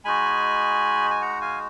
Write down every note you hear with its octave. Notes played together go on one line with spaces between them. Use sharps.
G#3 D#4 F#4 G#5 B5
G#5
F#5 A#5
F5 G#5